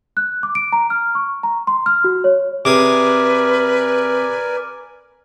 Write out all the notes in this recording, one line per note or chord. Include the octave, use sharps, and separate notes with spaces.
F#6
D6
D7
A#5
F6
C#6
A#5
C6
F6
F#4
C#5
C3 G#4 A#4 B4 D5 G#5 D6